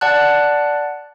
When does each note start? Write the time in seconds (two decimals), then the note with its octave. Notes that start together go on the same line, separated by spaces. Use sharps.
0.01 D5 F#5 A5 F#6